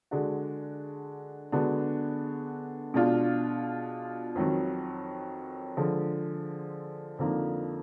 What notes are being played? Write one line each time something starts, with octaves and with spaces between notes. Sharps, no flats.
D3 G#3 D4 F#4
D3 G#3 B3 D4 F#4
B2 G#3 D4 F4
F2 D#3 F#3
D3 F3 G#3
F2 D3 F3 A#3 D#4